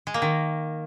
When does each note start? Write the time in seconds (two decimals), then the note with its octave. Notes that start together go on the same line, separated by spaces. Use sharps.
0.07 G#3
0.14 A#3
0.22 D#3